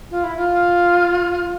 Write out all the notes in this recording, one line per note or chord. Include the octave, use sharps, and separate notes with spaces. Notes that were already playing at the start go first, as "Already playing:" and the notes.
F4
E4
F4